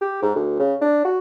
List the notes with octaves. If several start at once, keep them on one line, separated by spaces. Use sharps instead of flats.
G4
G#2
D2
C#3
D4
F#4